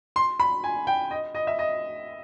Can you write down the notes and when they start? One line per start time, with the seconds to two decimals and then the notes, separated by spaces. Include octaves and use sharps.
0.16 C6
0.40 B5
0.64 G#5
0.87 G5
1.11 D#5
1.35 D#5
1.47 E5
1.59 D#5